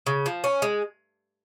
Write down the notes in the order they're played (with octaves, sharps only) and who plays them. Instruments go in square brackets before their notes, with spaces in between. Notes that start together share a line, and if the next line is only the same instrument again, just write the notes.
[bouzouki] C#3
F3
C#4
G#3